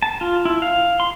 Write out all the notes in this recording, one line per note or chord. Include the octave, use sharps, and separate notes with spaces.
A5
F4
E4
F5
C6